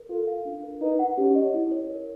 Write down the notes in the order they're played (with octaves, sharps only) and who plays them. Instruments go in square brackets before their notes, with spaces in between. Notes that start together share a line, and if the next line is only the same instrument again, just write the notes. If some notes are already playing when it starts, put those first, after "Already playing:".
Already playing: [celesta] A#4
[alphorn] F4 [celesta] A4
[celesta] F5
D4
A#4
[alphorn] D#4 [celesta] B4
[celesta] F#5
[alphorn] C#4 [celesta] G4
[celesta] D#5
E4
C#5
A#4